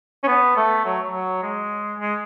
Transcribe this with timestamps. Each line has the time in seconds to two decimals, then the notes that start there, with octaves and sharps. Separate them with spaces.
0.24 C#4
0.27 B3
0.57 A3
0.85 F#3
1.12 F#3
1.43 G#3
2.00 G#3